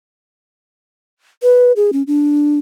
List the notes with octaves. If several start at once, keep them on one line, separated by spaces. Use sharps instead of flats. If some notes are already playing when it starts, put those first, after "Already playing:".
B4
G#4
C#4
D4